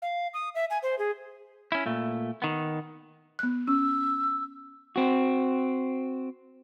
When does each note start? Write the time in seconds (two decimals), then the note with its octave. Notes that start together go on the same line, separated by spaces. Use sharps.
0.02 F5
0.34 D#6
0.55 E5
0.70 G#5
0.83 C5
0.99 G#4
1.72 C#4 E4
1.86 A#2 A3
2.42 D#3 B3
3.39 B3 F#6
3.68 C#4 E6
4.96 C4 F#4